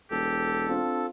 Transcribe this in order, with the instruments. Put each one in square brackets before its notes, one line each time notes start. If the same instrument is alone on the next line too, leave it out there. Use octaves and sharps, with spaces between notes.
[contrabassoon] E1 [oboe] G4 [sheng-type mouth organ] A4
[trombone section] C4 D4 F4